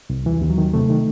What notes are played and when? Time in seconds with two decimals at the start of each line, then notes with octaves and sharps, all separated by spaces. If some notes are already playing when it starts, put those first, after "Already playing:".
0.10 C2
0.26 D#2 E3
0.41 D#2
0.50 F#3
0.58 D#3
0.73 C3 A3
0.90 D#3